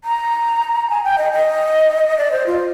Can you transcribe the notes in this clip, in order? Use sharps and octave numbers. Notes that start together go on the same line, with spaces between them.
A#5
G#5
G5
D#5
D#5
D5
C5
F4